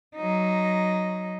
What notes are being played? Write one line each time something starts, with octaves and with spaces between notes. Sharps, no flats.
F#3 D#4